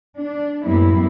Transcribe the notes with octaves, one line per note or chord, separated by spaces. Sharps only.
D4
F#2 A2 G3 A#3 B3 E4